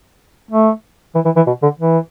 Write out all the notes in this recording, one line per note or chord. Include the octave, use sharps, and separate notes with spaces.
A3
E3
E3
E3
B2
D3
E3